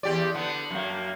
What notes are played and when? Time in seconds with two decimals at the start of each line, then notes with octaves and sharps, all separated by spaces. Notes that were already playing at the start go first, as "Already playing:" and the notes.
0.03 E2 G4 D5
0.35 D3 B3
0.71 F#2 A#3